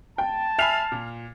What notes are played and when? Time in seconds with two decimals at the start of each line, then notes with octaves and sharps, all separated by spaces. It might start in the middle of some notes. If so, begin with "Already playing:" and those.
0.18 G5 A5
0.59 E5 G#5 B5 F6 C7 F7
0.92 A#2